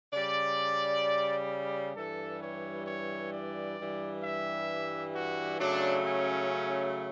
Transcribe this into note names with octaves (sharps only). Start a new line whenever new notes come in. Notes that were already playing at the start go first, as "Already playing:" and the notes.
C#3 G3 D5
G2 E3 G3 A4
C#5
C#5
D5
G2 E3 G3
E5
F#4
C#3 F#3 A3 D4
C#4